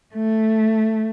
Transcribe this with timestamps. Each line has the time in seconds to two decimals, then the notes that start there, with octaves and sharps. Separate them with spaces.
0.14 A3